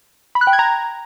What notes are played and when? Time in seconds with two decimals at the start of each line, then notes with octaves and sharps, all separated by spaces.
0.35 B5
0.41 F#6
0.47 G5
0.53 G#6
0.59 A#5